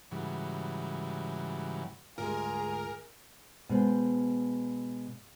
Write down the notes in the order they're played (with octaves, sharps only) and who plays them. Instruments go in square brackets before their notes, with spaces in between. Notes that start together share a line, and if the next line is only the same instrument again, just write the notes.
[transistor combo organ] G#2 C#3 E3 F#3 G3
[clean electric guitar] D2 G#2 F4 [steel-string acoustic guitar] G3 G#3 [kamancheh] G#4 [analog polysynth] A#4
[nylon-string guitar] B2 G#3 C5